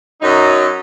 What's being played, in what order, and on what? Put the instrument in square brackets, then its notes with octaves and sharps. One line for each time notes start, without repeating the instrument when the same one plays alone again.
[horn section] F#2 F#3 D#4